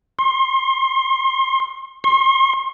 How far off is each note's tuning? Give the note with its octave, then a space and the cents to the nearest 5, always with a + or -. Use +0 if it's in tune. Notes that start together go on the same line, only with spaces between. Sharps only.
C6 +35
C6 +45